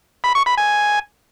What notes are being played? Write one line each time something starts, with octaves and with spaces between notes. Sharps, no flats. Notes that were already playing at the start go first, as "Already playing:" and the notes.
B5
C#6
B5
G#5